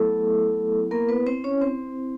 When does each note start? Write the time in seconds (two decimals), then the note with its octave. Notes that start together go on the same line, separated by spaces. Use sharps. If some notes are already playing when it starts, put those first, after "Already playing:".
Already playing: F#3 A3 B3 E4 A4
0.91 A#3 B3 E4 A#4
1.09 B3 B4
1.27 C4 C5
1.44 C#4 C#5
1.61 C4 C5